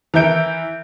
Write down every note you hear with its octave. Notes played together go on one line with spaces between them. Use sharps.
E3 A#4 E5 G6 D7